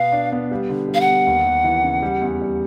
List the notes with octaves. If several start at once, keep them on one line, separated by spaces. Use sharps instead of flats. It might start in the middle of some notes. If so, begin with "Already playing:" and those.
Already playing: B2 B3 F5
D4
B3
G3
D3
G3
F5
F#5
B3
D#2
D#2
E3
C#3
G3
E2
G3